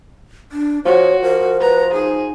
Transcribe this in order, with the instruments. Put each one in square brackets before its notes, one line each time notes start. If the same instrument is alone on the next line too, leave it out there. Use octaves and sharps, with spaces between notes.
[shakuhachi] D4
[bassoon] F3 [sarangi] F#4 [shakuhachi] C#5
[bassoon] F3 [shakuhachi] A#4
[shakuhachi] B4 [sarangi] A#5
[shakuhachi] D#4 [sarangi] G#4